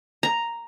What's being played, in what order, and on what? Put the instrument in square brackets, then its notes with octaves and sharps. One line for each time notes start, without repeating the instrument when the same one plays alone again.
[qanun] A#5